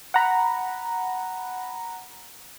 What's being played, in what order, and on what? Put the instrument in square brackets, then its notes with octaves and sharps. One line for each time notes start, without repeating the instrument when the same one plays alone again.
[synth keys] F#5 A#5 B5